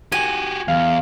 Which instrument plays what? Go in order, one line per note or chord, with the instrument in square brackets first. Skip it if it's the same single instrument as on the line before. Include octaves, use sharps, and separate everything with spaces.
[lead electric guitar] F#4 G4 [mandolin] G#5
[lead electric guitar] E2 [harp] F5